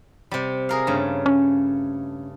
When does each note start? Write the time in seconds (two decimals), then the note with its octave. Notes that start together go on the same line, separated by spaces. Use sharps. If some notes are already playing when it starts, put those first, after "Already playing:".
0.31 C3 G3
0.69 G#4 A#4 F5
0.87 G2 C#3 A3
1.26 C#4